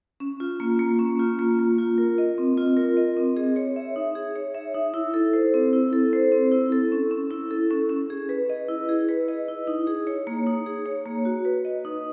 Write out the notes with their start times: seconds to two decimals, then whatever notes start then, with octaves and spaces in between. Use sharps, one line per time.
0.20 C#4
0.40 F4
0.60 A#3
0.79 A#3
0.99 C#4
1.19 F4
1.39 A#3
1.59 A#3
1.78 F4
1.98 A#4
2.18 D#5
2.38 C4
2.58 F4
2.77 A#4
2.97 D#5
3.17 C4
3.36 G#4
3.56 C#5
3.76 E5
3.96 D#4
4.15 G#4
4.36 C#5
4.55 E5
4.74 D#4
4.94 E4
5.14 A4
5.33 C5
5.54 C4
5.73 E4
5.93 A4
6.13 C5
6.32 C4
6.52 E4
6.72 A4
6.92 C#4
7.11 C#4
7.31 E4
7.51 A4
7.70 C#4
7.89 C#4
8.10 G#4
8.29 B4
8.49 D#5
8.68 E4
8.89 G#4
9.09 B4
9.28 D#5
9.48 E4
9.67 D#4
9.87 G#4
10.07 C#5
10.27 A#3
10.47 D#4
10.66 G#4
10.86 C#5
11.05 A#3
11.25 F#4
11.45 B4
11.65 D#5
11.85 D#4